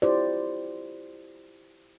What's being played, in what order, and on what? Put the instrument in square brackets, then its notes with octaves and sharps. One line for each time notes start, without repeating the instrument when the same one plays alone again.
[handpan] E4 F4 G4 C5 D5